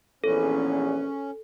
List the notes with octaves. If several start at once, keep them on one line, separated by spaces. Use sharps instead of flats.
A#1 E2 C#4 A4 B4